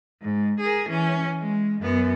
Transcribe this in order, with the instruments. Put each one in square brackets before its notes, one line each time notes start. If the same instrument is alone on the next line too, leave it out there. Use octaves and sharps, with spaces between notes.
[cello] G#2
G#4 A#4
E3 C#4
G#3
F#2 B3